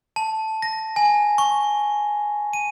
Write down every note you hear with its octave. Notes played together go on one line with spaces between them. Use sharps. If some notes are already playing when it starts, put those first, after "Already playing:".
A5
A#6
G#5
C#6
D#7